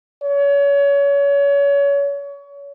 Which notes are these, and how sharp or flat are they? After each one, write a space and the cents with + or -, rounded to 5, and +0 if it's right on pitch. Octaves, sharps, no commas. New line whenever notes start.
C#5 +30